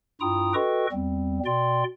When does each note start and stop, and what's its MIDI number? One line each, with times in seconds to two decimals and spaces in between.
0.21 0.54 43
0.21 0.54 64
0.21 0.54 65
0.21 0.54 79
0.21 0.54 82
0.21 0.54 87
0.54 0.87 66
0.54 0.87 69
0.54 0.87 71
0.54 0.87 75
0.54 0.87 79
0.54 0.87 85
0.92 1.40 40
0.92 1.40 55
0.92 1.40 60
1.46 1.84 47
1.46 1.84 74
1.46 1.84 79
1.46 1.84 84